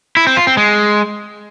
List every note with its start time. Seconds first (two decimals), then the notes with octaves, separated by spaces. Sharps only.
0.17 E4
0.27 C4
0.37 F4
0.47 C4
0.57 G#3